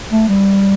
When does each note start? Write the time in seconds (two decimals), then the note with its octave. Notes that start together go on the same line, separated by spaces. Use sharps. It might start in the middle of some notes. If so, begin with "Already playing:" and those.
0.11 A3
0.28 G3